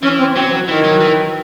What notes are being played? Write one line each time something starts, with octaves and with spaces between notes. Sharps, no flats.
E3 C#4
C4
F#3 C4
E3
D#3 E3
F#3
E3